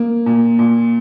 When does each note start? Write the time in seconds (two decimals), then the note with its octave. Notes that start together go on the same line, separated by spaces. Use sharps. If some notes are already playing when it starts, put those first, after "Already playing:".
Already playing: A#3
0.26 A#2
0.59 A#2